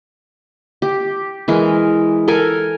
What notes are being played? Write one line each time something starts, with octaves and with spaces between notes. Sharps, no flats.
G4
E3 G#3 A#4
A4 A#4 G#5